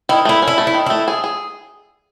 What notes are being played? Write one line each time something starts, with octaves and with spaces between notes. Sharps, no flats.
D#3 E4
A3 E4
C#4
E4
A3
E4
D#3
A3 E4
G#4
G#4